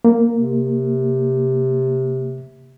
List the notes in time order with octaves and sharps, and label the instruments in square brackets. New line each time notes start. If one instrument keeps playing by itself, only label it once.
[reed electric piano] A#3
[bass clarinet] C3